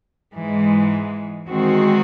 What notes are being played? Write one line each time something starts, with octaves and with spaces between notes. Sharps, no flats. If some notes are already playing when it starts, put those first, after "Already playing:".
G#2 E3 G#3
E2 D#3 G#3 C4 F#4